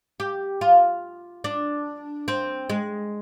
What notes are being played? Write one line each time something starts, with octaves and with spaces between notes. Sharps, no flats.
G4
F4
D4
C4
G#3